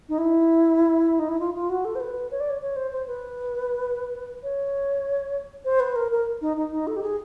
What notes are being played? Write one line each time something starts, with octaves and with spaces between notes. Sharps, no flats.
D#4
E4
D#4
E4
F4
F4
F#4
A4
C5
B4
C#5
D5
C#5
C#5
C5
C5
B4
C#5
C5
B4
A#4
A#4
D#4
D#4
D#4
A4
G4
G#4